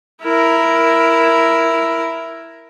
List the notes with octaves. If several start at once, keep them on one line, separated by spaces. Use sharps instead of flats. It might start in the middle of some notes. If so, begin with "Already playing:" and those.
E4 A#4